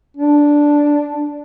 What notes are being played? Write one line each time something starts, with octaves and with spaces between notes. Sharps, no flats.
D4